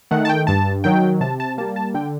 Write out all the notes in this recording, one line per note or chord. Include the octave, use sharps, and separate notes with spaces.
D#3 A3 F#5
A5
G5
G2 A5
D#3 F#3 G5
C3 A5
A5
G3 A#3 A5
A5
D3 G5